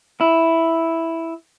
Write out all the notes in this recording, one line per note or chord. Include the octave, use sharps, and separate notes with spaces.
E4